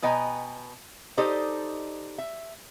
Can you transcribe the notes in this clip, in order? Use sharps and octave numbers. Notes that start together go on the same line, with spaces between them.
B2 B4 D#5 G5 G#5 A#5
D#4 G4 A4 C5 D5 D#5
E5